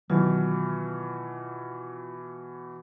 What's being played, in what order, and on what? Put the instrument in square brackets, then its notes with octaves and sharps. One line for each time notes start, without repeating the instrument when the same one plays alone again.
[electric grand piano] B2 E3 [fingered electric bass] D#3 F#3 [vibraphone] F4